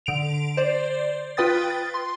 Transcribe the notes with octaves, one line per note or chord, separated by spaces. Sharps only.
D3 D7 F7
C5 D5
F4 B4 G5 D#6 A6
A6
C6